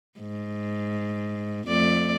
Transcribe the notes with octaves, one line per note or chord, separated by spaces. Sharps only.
G#2
F2 A3 D5